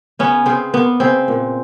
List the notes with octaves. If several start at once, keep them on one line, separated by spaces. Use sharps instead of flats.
C#3 B3 C#4
C#3 C4
A#3 B3
C#3 C4
A#2